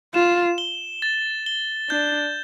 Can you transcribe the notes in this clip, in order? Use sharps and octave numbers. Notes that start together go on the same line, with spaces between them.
F4 E7
G7
A6
G7
D4 G6